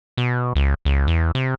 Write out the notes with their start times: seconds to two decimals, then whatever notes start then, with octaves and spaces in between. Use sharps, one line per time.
0.17 B2
0.56 C#2
0.85 C#2
1.07 E2
1.35 C3